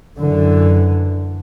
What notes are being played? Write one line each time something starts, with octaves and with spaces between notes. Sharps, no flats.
F#2 D3 E3